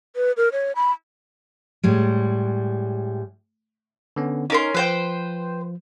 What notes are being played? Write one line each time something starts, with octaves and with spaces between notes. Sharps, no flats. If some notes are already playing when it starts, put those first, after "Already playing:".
B4
A#4
C#5
B5
A2 G3 G#3
D3 B3 C#4
C#4 D#4 A#4 C6
F3 B4 C5 G5